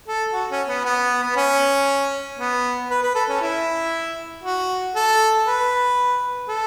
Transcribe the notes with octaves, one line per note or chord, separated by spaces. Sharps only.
A4
F#4
C#4
B3
B3
B3
C#4
B3
B4
B4
A4
C#4
E4
F#4
A4
B4
A4